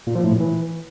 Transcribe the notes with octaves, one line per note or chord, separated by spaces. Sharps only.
A#2
F3
A2
A#2
E3